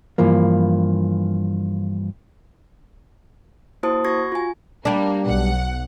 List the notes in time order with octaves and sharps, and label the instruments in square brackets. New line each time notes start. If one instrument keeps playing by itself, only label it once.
[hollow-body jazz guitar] G2 E3 F3 A#3
[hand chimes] A#3 E4 F#4 C5 A5 D#6
F#4 C#6 G#6 A#6
F4 G#5
[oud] G3 D4 [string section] A#3
[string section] B1 F#5